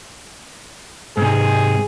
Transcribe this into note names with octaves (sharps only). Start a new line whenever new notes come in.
G#2 C3 G#4